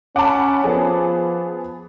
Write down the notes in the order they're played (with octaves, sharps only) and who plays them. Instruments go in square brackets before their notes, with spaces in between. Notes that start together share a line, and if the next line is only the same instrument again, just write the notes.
[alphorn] C#4 [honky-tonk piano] F#5 B5 [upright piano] A5 D6
[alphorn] F3 [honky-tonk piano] B3 G#4